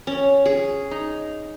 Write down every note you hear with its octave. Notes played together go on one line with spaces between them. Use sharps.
C#4
G#4
D#4